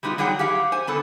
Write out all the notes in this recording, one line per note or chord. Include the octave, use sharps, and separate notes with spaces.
G3 G#3 B3 D#4 F4
F#3 G3 G#4 F#5 G5
G4 G#4 F5 F#5
C5 G#5
D3 B3 A4